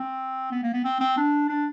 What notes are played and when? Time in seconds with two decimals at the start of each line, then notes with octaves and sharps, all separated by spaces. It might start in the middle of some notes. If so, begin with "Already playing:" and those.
Already playing: C4
0.52 B3
0.63 A#3
0.73 B3
0.84 C4
1.00 C4
1.17 D4
1.49 D4